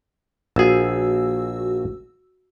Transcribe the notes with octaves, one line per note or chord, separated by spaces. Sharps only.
A#1 F#4 G#4 E6